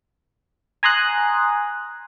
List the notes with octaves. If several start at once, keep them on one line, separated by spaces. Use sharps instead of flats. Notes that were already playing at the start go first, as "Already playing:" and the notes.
G#5 A#5 C6 D#6 F#6